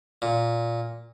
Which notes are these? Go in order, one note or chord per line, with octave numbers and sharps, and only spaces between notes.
A#2